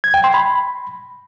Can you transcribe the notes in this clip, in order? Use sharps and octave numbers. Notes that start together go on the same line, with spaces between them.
G#6
G5
C6
B5